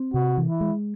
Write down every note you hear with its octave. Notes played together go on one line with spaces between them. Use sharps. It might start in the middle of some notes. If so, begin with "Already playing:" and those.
Already playing: C4
C3 F#4
E3
E4
G#3